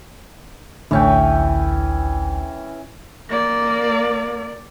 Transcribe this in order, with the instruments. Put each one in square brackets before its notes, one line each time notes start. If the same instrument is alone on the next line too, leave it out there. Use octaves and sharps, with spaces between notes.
[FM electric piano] A1 D2 D3 [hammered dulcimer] E3 C#4 G5
[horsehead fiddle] A#3 D5